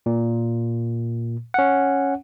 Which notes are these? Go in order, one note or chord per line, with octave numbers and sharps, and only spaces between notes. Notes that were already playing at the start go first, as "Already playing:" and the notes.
A#2
C#4 F#5